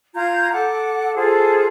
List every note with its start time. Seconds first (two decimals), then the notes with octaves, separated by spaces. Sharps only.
0.15 F4 A#5 G6 G#6
0.52 A4 F#5 D6
1.16 F4 G#4 A4 C5